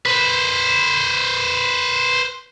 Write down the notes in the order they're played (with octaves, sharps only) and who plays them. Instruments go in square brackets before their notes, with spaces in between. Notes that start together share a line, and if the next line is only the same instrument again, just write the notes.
[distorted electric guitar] B4 C5